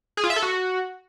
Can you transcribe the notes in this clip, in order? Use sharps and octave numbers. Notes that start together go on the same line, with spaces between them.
G#4
F4
E5
A4
F#4